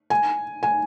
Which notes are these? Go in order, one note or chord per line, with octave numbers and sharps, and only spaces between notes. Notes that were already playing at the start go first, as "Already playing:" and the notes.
G#5
G#5